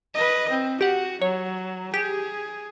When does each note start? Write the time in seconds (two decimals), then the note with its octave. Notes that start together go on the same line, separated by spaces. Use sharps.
0.14 B4 D#5
0.49 C4
0.81 F#4 G4 F#5
1.22 F#3 C#5
1.94 G4 G#4